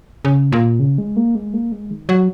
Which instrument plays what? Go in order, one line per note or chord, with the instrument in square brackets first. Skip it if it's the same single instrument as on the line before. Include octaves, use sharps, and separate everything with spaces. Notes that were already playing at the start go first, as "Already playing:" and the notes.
[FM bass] C#3
A#2
C#3
G#3
A#3
G#3
A#3
G#3
D#3
F#3